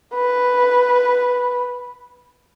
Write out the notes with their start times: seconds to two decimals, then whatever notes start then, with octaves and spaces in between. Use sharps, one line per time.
0.14 B4